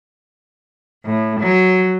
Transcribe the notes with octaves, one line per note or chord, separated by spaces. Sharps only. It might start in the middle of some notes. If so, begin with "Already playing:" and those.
A2
F#3